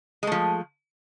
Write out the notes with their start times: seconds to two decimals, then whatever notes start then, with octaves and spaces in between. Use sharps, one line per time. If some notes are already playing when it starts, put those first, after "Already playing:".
0.23 G#3
0.27 A3
0.32 F3